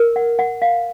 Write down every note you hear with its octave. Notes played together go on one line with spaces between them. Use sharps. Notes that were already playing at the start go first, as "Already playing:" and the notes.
Already playing: A#4
F#5
F#5
F5